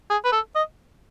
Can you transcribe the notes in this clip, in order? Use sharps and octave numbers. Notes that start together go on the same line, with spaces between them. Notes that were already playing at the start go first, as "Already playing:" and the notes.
G#4
B4
A4
D#5